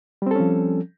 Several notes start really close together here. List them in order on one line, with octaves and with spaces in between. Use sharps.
G3 C4 A4 C#4 F3